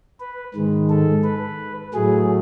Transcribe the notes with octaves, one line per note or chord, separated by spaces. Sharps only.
B4
G#2 D#3 G#3
A4
B4
A2 F#3 A3 G#4